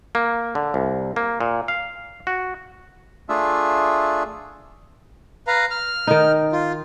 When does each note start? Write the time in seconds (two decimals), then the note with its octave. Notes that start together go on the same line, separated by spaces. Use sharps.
0.15 A#3
0.55 D3
0.74 C2
1.16 A#3
1.41 A#2
1.68 F5
2.27 F#4
3.29 A3 D4 F4 G#4 E5
5.47 B4 F5 A#5
5.71 F6
6.07 D#3 D#4
6.53 F4